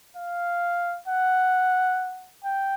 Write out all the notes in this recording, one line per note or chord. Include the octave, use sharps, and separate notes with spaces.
F5
F#5
G5